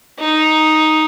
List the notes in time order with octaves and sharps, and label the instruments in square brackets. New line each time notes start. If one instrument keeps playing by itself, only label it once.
[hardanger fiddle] D#4